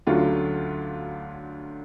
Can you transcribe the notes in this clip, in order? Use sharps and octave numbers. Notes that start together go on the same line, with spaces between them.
D2 D3 F#3 C#4 F4